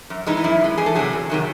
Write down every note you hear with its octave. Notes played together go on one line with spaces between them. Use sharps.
F#2
E3 G#3 D#4
D#4
F#2 E4
E3 G#3
E2 G#4
A4
C3 D#3 F#3 G#4
E2
C3 D#3 F#3